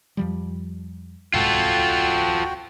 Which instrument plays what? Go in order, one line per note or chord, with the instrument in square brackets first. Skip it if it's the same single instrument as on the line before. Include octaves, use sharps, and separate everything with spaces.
[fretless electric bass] F2 F3 G3
[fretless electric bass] D1 C2 G#2 [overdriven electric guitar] F4 A4 [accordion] F#4 G5